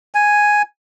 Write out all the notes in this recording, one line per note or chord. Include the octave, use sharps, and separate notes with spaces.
G#5